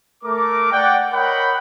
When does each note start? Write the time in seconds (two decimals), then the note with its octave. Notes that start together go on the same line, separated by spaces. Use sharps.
0.23 A3 A#4 D6
0.72 D5 F#5 G5
1.12 A#4 C#5 D#5 F#5 G5 B5